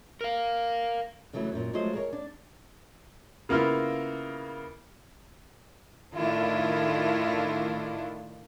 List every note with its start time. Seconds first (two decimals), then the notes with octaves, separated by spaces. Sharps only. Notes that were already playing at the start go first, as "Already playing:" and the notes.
0.21 A#4 F5
1.33 C#3 E3 F#3 A3
1.52 F#2 A#2
1.73 F3 F#3 G#3 A3 C5 D#5
1.93 G#4 A#4 C#5
2.13 D4
3.49 C#3 A#3 B3 E4 F4
6.15 A2 D#3 A3 D4 E4 F4